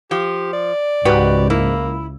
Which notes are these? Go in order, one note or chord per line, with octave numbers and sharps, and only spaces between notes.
F3 G4
D5
C#2 G#2 F#4 G4 B4
A#3 E4